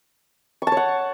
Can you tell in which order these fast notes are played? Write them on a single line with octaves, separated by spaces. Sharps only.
C#6 A5 C#5 F#5